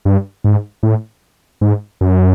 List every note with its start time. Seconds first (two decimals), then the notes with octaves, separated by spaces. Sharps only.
0.05 G2
0.44 G#2
0.83 A2
1.61 G#2
2.01 F#2